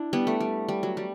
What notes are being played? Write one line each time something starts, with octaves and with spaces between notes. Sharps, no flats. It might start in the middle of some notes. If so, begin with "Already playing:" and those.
Already playing: D4 E4
G3 B3
A3
G3
G3
F#3
G3